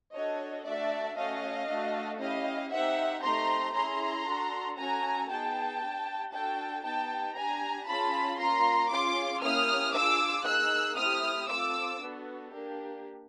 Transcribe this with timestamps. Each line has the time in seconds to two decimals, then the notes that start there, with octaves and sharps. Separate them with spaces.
0.14 D4 F#4 A4 C#5 D#5
0.66 A3 D4 F#4 A4 D5 E5
1.17 A3 C#4 F#4 A4 D#5 F5
1.69 A3 D4 F#4 A4
2.20 C#4 E4 G4 D#5 F5
2.72 C4 D#4 G4 E5 F#5
3.24 A3 C4 D#4 G4 A#5 C6
3.75 C#4 E4 G#4 A#5 C6
4.26 D4 F#4 A4
4.78 A3 C#4 F#4 A4 G#5 A#5
5.29 B3 D#4 G#4 G5 A5
5.81 D4 G4
6.33 D4 F#4 A4 G5 A5
6.85 B3 D#4 G4 G5 A5
7.36 D4 G4 G#5 A#5
7.87 C#4 F4 G#4 A5 B5
8.39 A#3 C#4 F4 A#5 C6
8.90 C#4 F4 G#4 C6 D6
9.42 A#3 C#4 E4 G4 D#6 F6
9.94 D4 F4 G#4 D6 E6
10.45 A#3 D#4 G#4 E6 F#6
10.97 A3 C4 E4 G4 D#6 F6
11.49 C4 F4 A4 D6 E6
12.00 B3 D4 F#4 A4
12.52 A#3 D4 G4